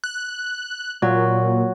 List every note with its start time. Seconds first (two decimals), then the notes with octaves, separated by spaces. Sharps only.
0.04 F#6
1.02 A#2 F#3